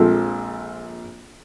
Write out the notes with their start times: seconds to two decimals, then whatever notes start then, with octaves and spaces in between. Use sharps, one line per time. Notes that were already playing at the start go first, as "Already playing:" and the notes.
Already playing: A#1 A#2 F3 G#3 C4 A4